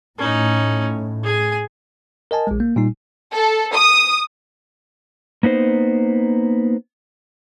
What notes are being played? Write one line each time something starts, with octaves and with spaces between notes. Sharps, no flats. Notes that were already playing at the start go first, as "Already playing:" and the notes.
A2 C#4 D#4
G#4 G#5
A#4 D#5 G#5 A5
A#1 G#3
A#3
A#2 G3 D#4
A4
D#6
A#3 B3 D#4 C5